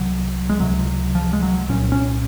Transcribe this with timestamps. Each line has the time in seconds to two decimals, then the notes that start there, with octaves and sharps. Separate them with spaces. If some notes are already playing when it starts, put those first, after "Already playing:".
Already playing: C2 C3 F#3
0.49 G#3
0.60 C#2 C3 F#3
1.15 F3
1.33 G#3
1.43 F#3
1.69 C2 A#2 C#4
1.92 C#4